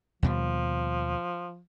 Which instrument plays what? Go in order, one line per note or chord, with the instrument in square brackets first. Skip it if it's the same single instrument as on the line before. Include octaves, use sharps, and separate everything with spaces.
[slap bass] D#2 B2 G3 [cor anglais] F3